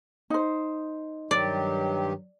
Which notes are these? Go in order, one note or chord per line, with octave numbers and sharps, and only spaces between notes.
D#4 C5
G2 D#3 F#3 G4 D5